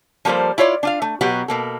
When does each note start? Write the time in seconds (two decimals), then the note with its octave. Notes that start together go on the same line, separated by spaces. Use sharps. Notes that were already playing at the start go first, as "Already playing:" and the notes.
0.25 F3 G3 A#3 A4 C5
0.58 E4 F4 C#5 D5
0.83 D4 F4 F5
1.02 A3
1.21 B2 F#3 B3 F#4 G4
1.48 B2 A#3 A4